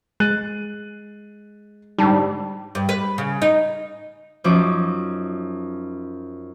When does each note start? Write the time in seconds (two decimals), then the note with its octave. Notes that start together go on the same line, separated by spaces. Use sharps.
0.20 G#3 F#6 A6 D#7
1.98 G#2 D3 G3 D#4 A5
2.75 G2
2.89 B4
3.18 C#3
3.42 D#4
4.44 F#2 F3 C#4 D#4 D6